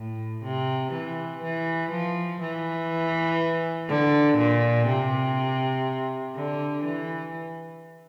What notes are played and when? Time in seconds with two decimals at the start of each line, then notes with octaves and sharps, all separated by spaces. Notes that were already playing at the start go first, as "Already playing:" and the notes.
Already playing: A2
0.43 C3
0.93 E3
1.42 E3
1.91 F3
2.41 E3
3.89 D3
4.38 A#2
4.88 C3
6.36 D3
6.85 E3